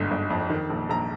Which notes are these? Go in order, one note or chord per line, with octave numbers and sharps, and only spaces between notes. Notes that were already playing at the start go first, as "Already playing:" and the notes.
Already playing: G1 G#2 D3
G1
F2
D#3
A#1
A#1 A#5